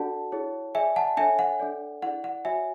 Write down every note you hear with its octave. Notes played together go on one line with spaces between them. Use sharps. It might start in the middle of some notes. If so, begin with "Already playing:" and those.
Already playing: D4 F#4 A4 D5 F#5 A5
E4 G#4 C#5
G#4 D5 E5 G#5
F#5 A5
D4 A4 C#5 E5 G#5
F#5
D4 A4 D5
E4 G#4 D5 F#5
F#5
F#4 C#5 E5 G#5